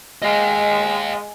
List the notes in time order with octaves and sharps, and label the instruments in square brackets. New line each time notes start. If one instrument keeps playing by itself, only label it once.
[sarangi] G#3 [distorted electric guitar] D#5 F5